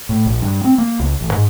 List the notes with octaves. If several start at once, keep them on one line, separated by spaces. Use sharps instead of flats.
A2
A#1
G2
C4
A#3
C#2
A1
G#2